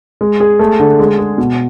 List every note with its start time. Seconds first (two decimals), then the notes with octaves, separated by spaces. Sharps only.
0.21 G#3
0.40 G#4
0.59 A3
0.80 D3
0.99 G#3
1.18 G#4
1.38 B2